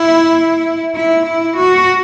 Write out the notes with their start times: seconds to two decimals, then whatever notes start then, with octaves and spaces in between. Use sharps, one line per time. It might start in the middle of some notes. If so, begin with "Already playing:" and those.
Already playing: E4
0.95 E4
1.26 E4
1.56 F#4